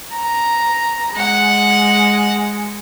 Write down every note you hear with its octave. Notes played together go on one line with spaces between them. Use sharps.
A#5
G#3 F#5